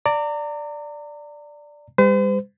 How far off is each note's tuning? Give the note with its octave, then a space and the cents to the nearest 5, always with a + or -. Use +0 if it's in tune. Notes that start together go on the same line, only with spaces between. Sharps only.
D5 +0 A#5 -35
G3 +35 C5 -45